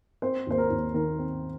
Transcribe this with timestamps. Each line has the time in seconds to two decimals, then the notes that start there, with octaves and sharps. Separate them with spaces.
0.22 C4 C5
0.47 D#2 C5
0.58 A#4
0.70 D#2
0.94 D#3 A#4
1.19 C4